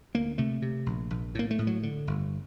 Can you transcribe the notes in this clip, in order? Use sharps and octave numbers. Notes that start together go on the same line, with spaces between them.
D2 A#3
C3 A3
C3
A#1
A#1
A2 A#3
A3
A2
F#3
D3
G1